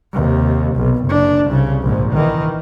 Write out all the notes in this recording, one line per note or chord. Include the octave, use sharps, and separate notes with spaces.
D#2 C3
B1
F#1 D4
C2 C#3
A#1 G#2
D#3 E3